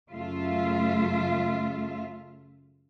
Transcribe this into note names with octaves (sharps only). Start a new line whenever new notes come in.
F#2 C#3 A3 F4 E5